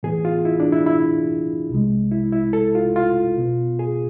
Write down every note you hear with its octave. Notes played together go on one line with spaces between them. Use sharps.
A2 E3 B3 G#4
F4
E4
D4
E4
E4
C2 C3 G#3
E4
E4
A4
F4
F4
B2 B3
G#4